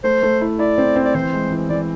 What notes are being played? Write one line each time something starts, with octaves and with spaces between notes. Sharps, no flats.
A3 C5
A3
E4
E4 D5
C4
C4
D5
E3 C5
G#3
E3
E3 D5